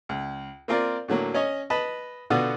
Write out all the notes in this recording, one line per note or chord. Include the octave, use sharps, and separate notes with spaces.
C#2
A#3 C4 F4 A#4 D5
A2 D3 F#3 A#3
C#4 C#5 D#5
B4 D#5 A5 B5
B2 D3 B3 F4 F#4 D5